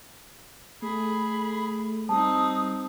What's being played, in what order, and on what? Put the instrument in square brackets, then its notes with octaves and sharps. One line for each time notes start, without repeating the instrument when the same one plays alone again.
[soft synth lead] A3 [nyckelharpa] G#4 [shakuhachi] B5
[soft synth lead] G3 [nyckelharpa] C4 D#4 [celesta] A5 [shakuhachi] D#6